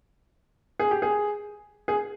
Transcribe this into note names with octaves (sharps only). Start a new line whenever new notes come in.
G#4
G4
G#4
G#4